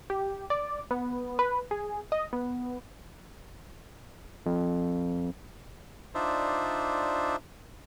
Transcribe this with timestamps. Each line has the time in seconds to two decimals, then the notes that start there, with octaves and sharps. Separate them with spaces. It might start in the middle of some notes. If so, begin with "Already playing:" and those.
0.10 G4
0.50 D5
0.91 B3
1.39 B4
1.71 G#4
2.12 D#5
2.33 B3
4.46 F2
6.15 D4 D#4 F4 C5 D5 E5